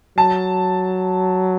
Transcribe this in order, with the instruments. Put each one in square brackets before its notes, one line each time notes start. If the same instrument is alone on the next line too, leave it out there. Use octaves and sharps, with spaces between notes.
[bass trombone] F#3 [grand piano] A5